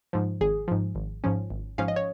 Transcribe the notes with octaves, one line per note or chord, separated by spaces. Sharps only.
G#2 F3
G#1 G#4
G#2 F3
G#1
G#2 F3 C#4
G#1
G#2 F3 C#4 F5
D#5
C#5